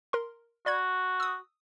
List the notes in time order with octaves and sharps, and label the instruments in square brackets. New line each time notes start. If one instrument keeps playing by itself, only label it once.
[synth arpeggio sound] A#4 C6
[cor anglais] F#4 [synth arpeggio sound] D5 B5 G#6
[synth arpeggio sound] D#6 E6